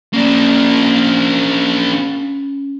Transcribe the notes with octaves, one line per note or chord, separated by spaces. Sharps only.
A#3 C#4 D4